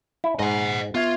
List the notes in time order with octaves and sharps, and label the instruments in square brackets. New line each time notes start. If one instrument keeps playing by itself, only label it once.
[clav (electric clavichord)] E4
[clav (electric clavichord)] G#2 [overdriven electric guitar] D#5 F#5
[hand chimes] B3 E5 G#6 [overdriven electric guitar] F4